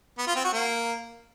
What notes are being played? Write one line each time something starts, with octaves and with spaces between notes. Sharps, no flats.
B3
F4
C4
F#4
A#3